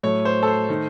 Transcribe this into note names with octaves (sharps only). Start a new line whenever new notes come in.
A2 F#3 A3 C#5
C5
A4
C5
D#3 A3